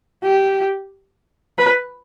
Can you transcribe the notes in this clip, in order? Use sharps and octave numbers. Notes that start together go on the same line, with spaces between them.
G4
B4